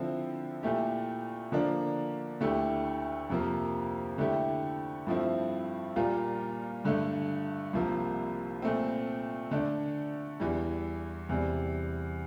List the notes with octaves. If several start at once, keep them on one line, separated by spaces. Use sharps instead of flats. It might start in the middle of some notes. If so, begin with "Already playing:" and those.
Already playing: D3 F3 C4 E4
A#2 A3 E4 G4
D3 F3 A#3 D4
D2 D3 A3 E4 G4
F2 C3 F3 A#3
D3 A3 E4 G4
G2 F3 A3 C4 E4
A#2 G3 A#3 F4
G2 D3 A3
C2 C3 F3 A#3
A#2 A3 C4
D3 A3 D4
E2 E3 G3
E2 C3 G3